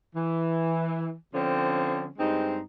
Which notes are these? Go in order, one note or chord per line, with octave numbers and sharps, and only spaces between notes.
E3
D3 F3 C4 C#4
G2 G#3 C4 D#4